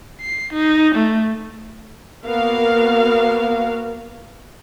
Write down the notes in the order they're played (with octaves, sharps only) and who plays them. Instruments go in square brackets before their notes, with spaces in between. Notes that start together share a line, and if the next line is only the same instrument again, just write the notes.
[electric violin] C7
D#4
A3
[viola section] A#3 B3 F#4 A#4 F5